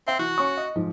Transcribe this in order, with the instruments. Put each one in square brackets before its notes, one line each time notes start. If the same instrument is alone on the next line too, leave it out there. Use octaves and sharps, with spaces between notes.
[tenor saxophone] C4 [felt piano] E5
[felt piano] E3 [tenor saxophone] F#4
[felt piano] C#4 C#6
D#5
G#2 F3